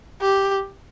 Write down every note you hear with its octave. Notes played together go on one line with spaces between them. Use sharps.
G4